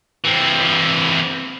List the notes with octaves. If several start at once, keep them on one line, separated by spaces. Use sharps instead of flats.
E3 C4